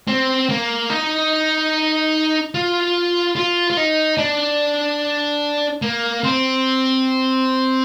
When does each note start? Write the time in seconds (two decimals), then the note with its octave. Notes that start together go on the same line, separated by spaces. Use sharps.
0.08 C4
0.49 A#3
0.90 D#4
2.55 F4
3.36 F4
3.70 F4
3.77 D#4
4.18 D4
5.82 A#3
6.24 C4